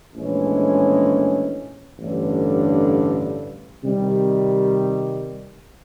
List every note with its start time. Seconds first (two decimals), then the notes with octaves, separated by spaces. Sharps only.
0.14 A#1 A2 E3 G#3 C#4
1.98 A1 G2 D3
3.83 C3 D#3 G3